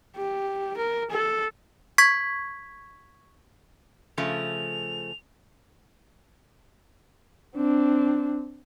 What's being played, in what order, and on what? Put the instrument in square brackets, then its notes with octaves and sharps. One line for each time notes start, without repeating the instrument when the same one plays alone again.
[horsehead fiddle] G4
A#4
A4
[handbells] C#6 G#6 B6
[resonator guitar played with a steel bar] C#3 F3 A3 [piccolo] F7
[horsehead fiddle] C4 D4